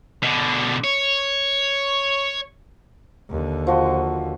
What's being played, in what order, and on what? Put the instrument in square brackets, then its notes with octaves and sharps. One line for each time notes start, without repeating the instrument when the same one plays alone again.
[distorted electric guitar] B2 D3
C#5
[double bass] D#2 D3
[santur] F3 F#4 C6